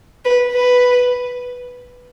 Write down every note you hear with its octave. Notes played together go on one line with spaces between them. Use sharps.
B4
B4